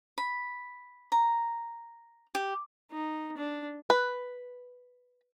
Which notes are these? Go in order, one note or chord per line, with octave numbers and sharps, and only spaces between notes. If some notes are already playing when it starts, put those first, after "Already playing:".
B5
A#5
G4
D#4
D4
B4